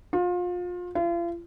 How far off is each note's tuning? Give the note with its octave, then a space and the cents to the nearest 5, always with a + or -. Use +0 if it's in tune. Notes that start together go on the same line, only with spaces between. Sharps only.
F4 +30
F4 -40